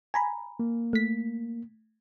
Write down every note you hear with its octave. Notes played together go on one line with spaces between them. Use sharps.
G#5 A#5 B5
A#3
A3 B6